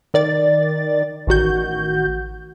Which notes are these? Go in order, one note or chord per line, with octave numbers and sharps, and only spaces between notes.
D#3 D5 A6
A1 D#3 F#4 G6